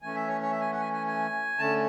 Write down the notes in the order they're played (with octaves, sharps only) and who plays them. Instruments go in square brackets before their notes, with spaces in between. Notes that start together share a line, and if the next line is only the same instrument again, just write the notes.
[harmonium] E3 A3 C#4 G#5
E5
C#5
C#5
E5
G#5
F#5
G#5
G#5
G#5
D3 A3 C#4 A5